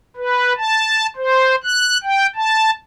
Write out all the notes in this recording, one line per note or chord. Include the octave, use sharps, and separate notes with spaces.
B4
A5
C5
F#6
G5
A5